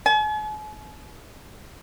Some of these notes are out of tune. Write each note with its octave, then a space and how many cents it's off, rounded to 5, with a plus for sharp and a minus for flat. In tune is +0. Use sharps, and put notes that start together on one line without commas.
G#5 +45